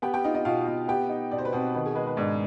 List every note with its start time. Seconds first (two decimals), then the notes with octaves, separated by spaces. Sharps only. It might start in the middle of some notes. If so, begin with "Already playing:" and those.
0.02 B3 G4 G5
0.13 G4 G5
0.24 D#4 F4 D#5
0.34 D#4 D#5
0.45 B2 F4 F5
0.67 B2
0.88 B3 G4 G5
1.09 D#4
1.31 B2 D5
1.38 C5
1.45 B4
1.52 B2 C4 C5
1.74 D#3 B4
1.85 G#4
1.95 G#3 B4
2.07 B4
2.17 G#2 D4 D5